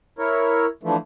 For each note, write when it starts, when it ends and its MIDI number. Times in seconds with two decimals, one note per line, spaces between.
0.19 0.66 64
0.19 0.66 70
0.19 0.66 73
0.83 0.96 50
0.83 0.96 52
0.83 0.96 53
0.83 0.96 57